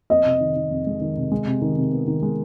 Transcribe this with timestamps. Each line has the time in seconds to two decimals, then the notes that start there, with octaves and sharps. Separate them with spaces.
0.10 F2 D#5
0.25 C3
0.40 D#3
0.56 D#3
0.71 F2
0.87 G#3
1.01 D#3
1.17 C3
1.32 G#3
1.47 C3
1.62 D#3
1.78 C3
1.92 B3
2.08 D#3
2.23 G#3